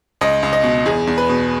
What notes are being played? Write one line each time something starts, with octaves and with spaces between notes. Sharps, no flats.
C#2 D#5
C#2
D#5
B2
E2 G#4
E2
B4
B2